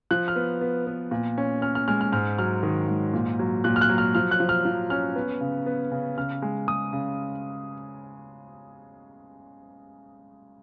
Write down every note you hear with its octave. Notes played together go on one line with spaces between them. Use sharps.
F3 F#6
F6
B3
B3
B3
A#2
C#4
C#4 F6
F6
G#3 F6
F6
G#2 F6
F#3 F6
D#3
G#2
A#2
F#3
A#2 F#6
F6
F#6
F#3
F6
F3 F6
F#6
F3
F6
F3
C#4 F6
B3
C#3
B3
C#3
C#3 F6
G#3
G#3 D#6
C#3